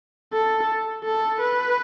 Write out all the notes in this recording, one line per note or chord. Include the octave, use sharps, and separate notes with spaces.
A4
A4
B4